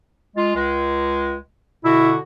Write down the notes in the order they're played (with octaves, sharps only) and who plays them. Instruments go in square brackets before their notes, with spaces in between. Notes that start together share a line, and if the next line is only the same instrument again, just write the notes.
[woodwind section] G#3 F4
C#2 G#3
[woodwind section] B2 D3 F#4 [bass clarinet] E4